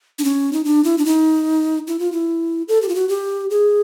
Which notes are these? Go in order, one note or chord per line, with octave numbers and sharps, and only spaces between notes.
D4
C#4
D#4
D4
E4
D4
D#4
E4
F4
E4
A4
G4
F4
F#4
G4
G#4